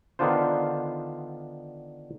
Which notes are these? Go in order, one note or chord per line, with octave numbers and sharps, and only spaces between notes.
D3 D#3 B3 D4 F4 C5